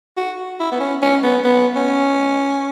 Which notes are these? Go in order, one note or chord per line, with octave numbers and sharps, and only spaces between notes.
F#4
E4
B3
C#4
C#4
B3
B3
C#4